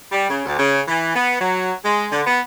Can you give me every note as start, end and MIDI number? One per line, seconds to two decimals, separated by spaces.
0.12 0.26 55
0.28 0.43 49
0.46 0.56 38
0.58 0.81 49
0.88 1.12 52
1.16 1.38 59
1.39 1.72 54
1.85 2.07 56
2.12 2.22 50
2.27 2.39 59